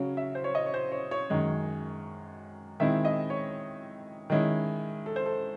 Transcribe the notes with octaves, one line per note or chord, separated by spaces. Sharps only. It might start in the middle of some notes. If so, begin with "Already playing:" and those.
Already playing: C#3 F#3 C#4
E5
C5
C#5
D#5
C#5
C5
C#5
C#5
F#2 D#3 G#3
D#3 G#3 C4 E4 E5
D#5
C#5
D#3 G#3 C#4 E4
A4
C5
A4